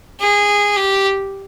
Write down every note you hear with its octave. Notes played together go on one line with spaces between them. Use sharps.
G#4
G4